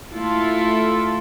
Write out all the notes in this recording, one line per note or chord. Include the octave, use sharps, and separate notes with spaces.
A3 E4 F4 A4